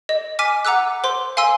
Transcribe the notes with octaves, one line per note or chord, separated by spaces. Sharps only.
D#5
G#5 D6 F6 B6 D#7
F#5 A#5 D6 E6 F#6
C5 C6
F5 G#5 C6 E6